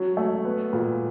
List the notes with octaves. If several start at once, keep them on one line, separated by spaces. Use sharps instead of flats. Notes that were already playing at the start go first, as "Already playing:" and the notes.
Already playing: F#3 C#4
A3
B3
A#2